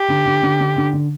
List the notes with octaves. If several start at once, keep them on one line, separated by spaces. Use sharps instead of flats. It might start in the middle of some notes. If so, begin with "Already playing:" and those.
Already playing: G4
D3
D3
D3
D3
D3
D3